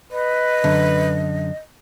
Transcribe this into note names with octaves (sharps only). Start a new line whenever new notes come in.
B4 D#5
F#2 D3